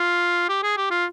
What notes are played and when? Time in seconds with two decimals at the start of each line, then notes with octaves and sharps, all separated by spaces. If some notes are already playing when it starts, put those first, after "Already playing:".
Already playing: F4
0.49 G4
0.63 G#4
0.77 G4
0.91 F4